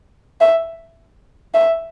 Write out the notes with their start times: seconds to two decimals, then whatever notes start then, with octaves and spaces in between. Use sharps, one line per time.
0.41 E5
1.54 E5